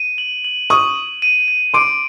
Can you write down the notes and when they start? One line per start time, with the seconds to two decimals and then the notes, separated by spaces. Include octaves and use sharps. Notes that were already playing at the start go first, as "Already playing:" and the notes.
Already playing: D#7
0.18 F#7
0.44 F#7
0.70 C#6 D#6 F#7
0.96 F#7
1.22 D#7
1.48 D#7
1.74 C6 D6 D7